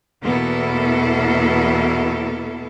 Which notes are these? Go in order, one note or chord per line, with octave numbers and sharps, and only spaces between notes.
E2 B2 A#3 B3 E4 A4